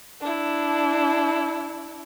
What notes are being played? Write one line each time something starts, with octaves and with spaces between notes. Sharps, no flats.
D4 E4